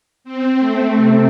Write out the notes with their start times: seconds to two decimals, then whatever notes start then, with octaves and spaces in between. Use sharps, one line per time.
0.24 C4
0.59 A3
0.95 C3